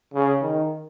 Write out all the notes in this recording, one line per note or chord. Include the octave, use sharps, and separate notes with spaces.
C#3
D#3